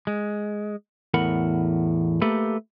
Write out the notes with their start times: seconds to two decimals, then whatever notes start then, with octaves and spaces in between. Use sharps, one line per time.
0.07 G#3
1.14 E2 A2 A#4 F#5 B5
2.22 A3 A#3 G4 A4 B4